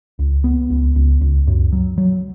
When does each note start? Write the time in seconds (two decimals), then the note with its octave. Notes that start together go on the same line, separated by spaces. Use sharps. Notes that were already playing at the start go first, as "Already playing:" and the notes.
0.19 C#2
0.44 B3
0.70 C#2
0.96 C#2
1.21 C#2
1.47 F#2
1.72 F#3
1.98 F#3